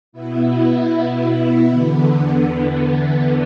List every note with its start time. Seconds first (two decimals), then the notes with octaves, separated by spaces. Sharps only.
0.12 B2 B3 E4
1.68 E2 D3 B3